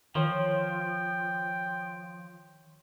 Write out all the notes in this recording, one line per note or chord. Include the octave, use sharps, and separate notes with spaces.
D#3 F3 C#5 G5